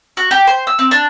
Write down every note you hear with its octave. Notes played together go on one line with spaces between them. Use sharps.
F#4
G4
C5
E6
C4
D4